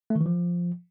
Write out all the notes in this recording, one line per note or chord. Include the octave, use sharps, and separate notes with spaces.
A3
D#3
E3
F3